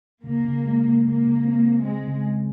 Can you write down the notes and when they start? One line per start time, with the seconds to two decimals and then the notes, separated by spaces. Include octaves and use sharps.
0.24 C#3 A#3
0.45 C#3
0.64 G#3
0.84 C#3
1.04 C#3 A#3
1.23 C#3
1.45 C4
1.64 C4
1.83 G#3 C4
2.04 C#3
2.24 G#3